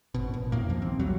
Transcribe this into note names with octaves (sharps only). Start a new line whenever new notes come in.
G#1 B2
A#1
F2 A2 A#3
D#2 D#3 F3 A#3
C2 C4
D#1 E2 F#3 G3